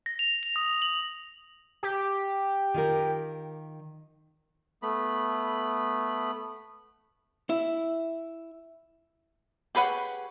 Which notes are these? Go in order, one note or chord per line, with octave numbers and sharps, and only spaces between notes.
A#6
F7
F7
D#6
F#7
G4
D#3 F4 A#4
A3 B3 B5
E4
G4 G#4 B4 C#5 F#5